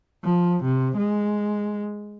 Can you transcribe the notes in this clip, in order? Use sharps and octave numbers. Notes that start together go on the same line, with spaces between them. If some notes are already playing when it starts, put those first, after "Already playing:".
F3
C3
G#3